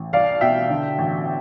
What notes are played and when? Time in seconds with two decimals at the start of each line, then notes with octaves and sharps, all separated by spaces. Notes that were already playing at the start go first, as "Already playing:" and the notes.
Already playing: A1
0.13 C2 D5 F5
0.41 B2 E5 G5
0.70 D3
0.98 A1